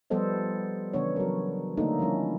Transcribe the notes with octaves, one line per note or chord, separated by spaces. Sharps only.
F3 G3 B3 A4 C5 D#5
C#3 E3 B3 D4 C#5
F#3 A#4
D3 A3 A#3 D4 D#4 A4
F3 G3 C#4 E4